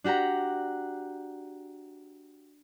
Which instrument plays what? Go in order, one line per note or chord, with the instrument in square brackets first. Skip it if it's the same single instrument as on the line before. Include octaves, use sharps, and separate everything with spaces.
[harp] D4 F#4 G4 F#5 A#5